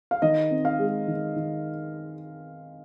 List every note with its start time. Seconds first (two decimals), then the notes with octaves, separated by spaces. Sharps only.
0.11 F5
0.22 D#3 D#5
0.50 C4
0.65 F5
0.79 G#3
1.08 D#3
1.36 D#3